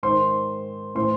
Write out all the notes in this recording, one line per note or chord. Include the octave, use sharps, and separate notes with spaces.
G#2 D#3 C5 C6
A2 E3 C5 C6